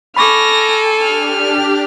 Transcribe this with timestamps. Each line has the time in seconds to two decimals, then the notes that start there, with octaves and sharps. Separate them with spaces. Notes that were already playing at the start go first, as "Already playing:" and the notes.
0.17 A4 G#5 B5 C#6 D6 F6 A#6 D7
1.02 D4 G4 F6